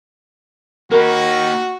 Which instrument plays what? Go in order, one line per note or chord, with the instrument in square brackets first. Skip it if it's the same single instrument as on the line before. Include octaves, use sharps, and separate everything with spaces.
[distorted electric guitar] A#3 D#4 [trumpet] F#4 [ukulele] A#4 B5